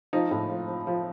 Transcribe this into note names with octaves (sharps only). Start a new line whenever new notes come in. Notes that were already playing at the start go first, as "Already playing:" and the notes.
F3 D#4
A2
F3
F3
F3